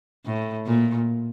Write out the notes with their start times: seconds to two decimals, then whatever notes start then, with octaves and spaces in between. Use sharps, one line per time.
0.26 A2
0.67 A#2